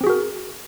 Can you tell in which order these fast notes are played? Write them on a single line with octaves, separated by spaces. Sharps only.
C4 G#4 F#4 A#4